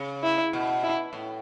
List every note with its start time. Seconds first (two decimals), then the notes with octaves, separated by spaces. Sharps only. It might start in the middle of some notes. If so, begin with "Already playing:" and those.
Already playing: C#3
0.23 E4
0.53 B2
0.83 E4
1.13 A2